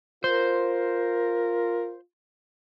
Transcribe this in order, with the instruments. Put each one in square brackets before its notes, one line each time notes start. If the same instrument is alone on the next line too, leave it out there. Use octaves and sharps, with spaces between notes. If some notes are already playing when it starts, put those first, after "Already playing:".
[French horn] F4 [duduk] A#4 [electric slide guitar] C5